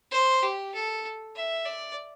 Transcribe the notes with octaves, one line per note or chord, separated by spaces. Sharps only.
C5
G4
A4
E5
D5